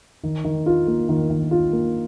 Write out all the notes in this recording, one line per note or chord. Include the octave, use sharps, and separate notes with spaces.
D#3
D#3
F4
A#3
D#3
D#3
F4
A#3